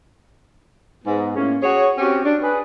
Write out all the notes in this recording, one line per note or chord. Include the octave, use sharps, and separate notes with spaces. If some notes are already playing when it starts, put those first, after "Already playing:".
G#2 B3
A2 A#3 C#4
F#4 G#4 C#5
C4 C#4 F#4 G4
D4
G#4 B4